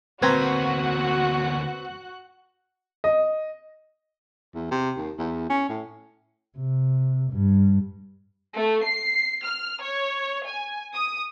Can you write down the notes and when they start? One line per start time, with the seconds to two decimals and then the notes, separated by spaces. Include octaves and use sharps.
0.22 D2 A#3 C4 F#4 B4 A#5 F#6 G#6
3.04 D#5
4.55 E2
4.71 C3
4.97 D#2
5.19 E2
5.49 C#4
5.69 A2
6.57 C3
7.31 G2
8.56 A3
8.86 C7
9.45 F6
9.82 C#5
10.48 G#5
10.95 D#6